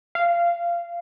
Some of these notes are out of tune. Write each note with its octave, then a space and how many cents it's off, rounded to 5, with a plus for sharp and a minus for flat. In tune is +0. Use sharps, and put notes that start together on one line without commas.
F5 -15